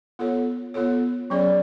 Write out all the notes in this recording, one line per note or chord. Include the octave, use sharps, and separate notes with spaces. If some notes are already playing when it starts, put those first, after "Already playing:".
B3 F4 A4 C#5
B3 F4 A4 C#5
F#3 C#4 G#4 D5